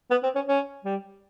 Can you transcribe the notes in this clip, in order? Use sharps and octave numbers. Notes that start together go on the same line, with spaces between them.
B3
C4
C#4
C#4
G3